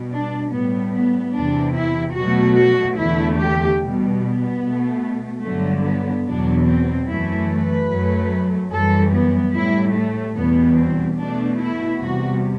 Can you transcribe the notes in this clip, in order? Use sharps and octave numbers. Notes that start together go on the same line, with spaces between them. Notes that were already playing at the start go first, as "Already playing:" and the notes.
Already playing: B2 G3
D4
A2 G3 B3
B3
E2 C3 E3 D4
E4
B2 F#3 A3 F#4
F#4
E2 D3 A3 E4
G4
B2 G3
B3
B2 A3
G2 D3 F#3 A3
B3
E2 B2 F#3 D4
C4
F#2 E3 A3 E4
B4
F#2 F#3 A3
F#2 E3 G3 A4
B3
A2 G3 E4
A3
E2 B2 G3 B3
C4
B2 A3 D4
E4
E2 C3 G3 F#4